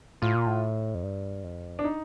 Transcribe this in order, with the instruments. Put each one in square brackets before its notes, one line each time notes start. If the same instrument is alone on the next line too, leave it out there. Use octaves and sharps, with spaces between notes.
[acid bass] A2 [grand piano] F4
[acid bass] A#2
A2
F2
G2
F2
[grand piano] D4
D#4